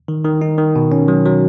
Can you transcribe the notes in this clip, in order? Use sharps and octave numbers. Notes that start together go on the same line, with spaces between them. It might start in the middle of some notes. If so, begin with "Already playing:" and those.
D#3
D#3
D#4
D#3
B2
C#4
F#3
F#3